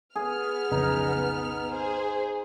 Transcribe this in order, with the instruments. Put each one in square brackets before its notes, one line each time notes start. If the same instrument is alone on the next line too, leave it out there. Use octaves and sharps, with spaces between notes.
[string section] B3 F6 [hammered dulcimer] G#4
[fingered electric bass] B1 F2 C#3 [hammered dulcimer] D#4
[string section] G#4 C5